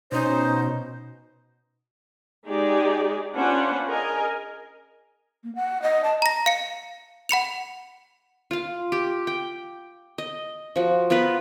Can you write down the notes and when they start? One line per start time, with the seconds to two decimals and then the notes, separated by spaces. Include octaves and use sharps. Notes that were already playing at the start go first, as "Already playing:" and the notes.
0.12 B2 C#4 D#4 C5
2.47 G#3 D#4 G4 G#4 D5
3.35 C#4 D4 F4 B4 C5 F#5
3.89 G#4 A#4 D#5 G#5
5.44 A#3
5.55 F#5
5.82 D#5
6.04 A5
6.22 A#5 A#6
6.46 F5 C#7
7.29 F#5 B5 C#7 F7
8.51 F4 F5
8.92 G4
9.27 G5
10.18 D#5
10.76 F3 F#4
11.10 B3 F4 A#4 B4